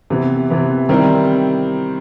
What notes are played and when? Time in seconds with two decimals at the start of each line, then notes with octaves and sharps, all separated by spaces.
0.10 C3 E3 B3
0.50 C3 E3 B3
0.89 D#3 G3 C4 E4